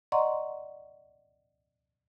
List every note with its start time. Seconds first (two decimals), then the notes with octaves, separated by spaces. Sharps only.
0.12 D5 D#5 F#5 A#5 C6 C#6